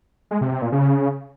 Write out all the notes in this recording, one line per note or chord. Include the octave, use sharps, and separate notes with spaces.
G#3
C3
C3
A#2
C#3